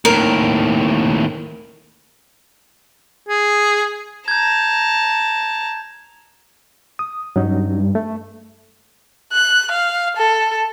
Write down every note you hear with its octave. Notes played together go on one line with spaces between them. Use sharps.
D#2 A2 A#4
G#4
A5 A#5 G6 G#6
D#6
G2 F#3 C#4 D#4
A3
F#6
F5
A4